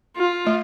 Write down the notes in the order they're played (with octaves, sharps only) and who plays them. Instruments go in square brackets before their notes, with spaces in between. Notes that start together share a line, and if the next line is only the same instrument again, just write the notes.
[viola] F4
[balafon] A3